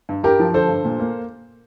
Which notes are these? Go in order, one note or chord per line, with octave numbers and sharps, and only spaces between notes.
G2
G2 G4 A#4
F3
D3 A4 C5
G2
A#2
A#3